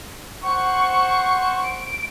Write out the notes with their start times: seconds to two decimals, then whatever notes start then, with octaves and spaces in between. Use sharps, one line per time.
0.42 C5 F#5 C#6
1.63 D7